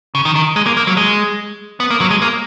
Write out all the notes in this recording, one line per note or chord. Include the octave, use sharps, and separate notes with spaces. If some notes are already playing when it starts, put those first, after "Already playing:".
C#3
D#3
D#3
G#3
A#3
A#3
F#3
G#3
B3
A#3
F#3
G#3
A#3